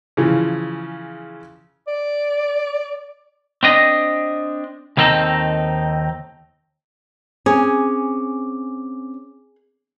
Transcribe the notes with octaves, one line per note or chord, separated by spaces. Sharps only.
C#3 E3 F3
D5
C4 D4 D#5
D#2 D#3 C4 D#4 A4
C4 C#4 G#4 D6